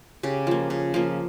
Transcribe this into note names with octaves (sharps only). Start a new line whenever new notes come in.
C#3 G4
F3 A#3
C#3
F3 A#3